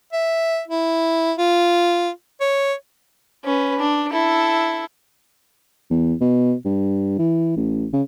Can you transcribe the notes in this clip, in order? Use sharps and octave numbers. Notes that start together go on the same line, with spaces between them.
E5
E4
F4
C#5
C#4 B4
D4
E4 A4
E2
B2
G2
E3
A1
C#3